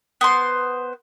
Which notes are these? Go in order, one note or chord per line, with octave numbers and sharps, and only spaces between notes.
B3 C5 C6